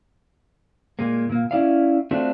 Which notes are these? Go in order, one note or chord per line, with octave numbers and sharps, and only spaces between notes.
A#2 G#3 A#3
A#2 A#3
C#4 E4 D5 F5
A3 C4 D4 F4 F#4 A4